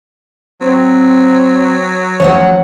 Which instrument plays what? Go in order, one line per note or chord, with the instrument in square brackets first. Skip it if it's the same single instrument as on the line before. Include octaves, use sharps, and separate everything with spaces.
[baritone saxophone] F#3 [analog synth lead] C4
[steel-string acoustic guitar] F3 A3 F#5 [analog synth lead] C#4 [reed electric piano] C#5